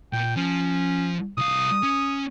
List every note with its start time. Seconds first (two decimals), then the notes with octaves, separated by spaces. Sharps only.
0.13 A#2 G5
0.37 F3 C#4
1.38 C2 F5 D#6
1.83 C#4